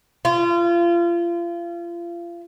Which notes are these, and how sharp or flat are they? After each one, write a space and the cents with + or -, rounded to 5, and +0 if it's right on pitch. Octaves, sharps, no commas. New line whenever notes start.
F4 -30